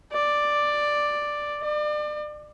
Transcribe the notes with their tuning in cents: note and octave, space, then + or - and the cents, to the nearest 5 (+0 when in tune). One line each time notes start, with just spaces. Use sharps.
D5 +5
D5 +35